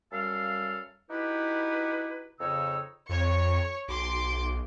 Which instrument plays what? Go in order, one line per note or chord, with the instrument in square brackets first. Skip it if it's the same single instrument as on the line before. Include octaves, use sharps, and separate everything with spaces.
[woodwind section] F#2 G3 A4 F5
D#4 E4 F#4 G4 B4
F2 C#3 D#4 C#5 E6
[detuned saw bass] F2 [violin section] C#5 C#6
[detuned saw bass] B1 [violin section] C6 D6